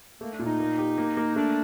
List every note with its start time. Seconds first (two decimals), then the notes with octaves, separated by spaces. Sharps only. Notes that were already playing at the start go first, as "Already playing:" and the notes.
0.21 A3 A#3
0.33 D4
0.39 A#2
0.46 D#4
0.60 A#3
0.78 G4
0.98 A#3
1.17 A#3
1.36 A3 D4